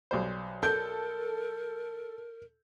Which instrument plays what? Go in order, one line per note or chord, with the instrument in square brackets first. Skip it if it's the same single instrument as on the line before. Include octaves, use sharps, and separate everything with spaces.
[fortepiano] B1 G3 C5
[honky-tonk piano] A4 [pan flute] A#4 [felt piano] G6